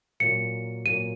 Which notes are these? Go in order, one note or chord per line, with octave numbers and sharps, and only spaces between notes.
A#2 F#3 A#3 C#7
A#2 F#3 A#3 D#7